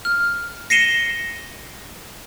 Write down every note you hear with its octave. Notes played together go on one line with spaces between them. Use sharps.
F6
A#6 C7 C#7 D#7 E7 G7